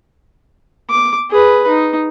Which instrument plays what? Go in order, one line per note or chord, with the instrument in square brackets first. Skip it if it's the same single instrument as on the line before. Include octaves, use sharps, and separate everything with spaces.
[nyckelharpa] D6
G#4 B4
D#4